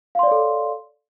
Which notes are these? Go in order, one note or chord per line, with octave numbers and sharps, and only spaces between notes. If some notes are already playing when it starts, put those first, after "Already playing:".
A4 C#5 D5 F5 C6